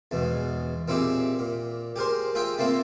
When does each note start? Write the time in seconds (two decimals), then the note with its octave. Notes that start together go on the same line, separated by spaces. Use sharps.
0.11 E2 G#2 B2
0.88 A#2 C4 D#4 E4 G4 G#4
1.39 A#2
1.96 G4 G#4 A#4 C5
2.35 F4 G#4 D#5 E5 G5
2.58 A3 A#3 C4 E4 F4